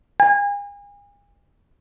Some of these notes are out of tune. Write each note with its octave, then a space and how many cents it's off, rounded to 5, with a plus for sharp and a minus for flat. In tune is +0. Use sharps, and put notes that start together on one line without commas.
G#5 -40